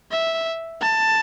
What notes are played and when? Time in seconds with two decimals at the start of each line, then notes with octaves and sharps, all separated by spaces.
0.11 E5
0.81 A5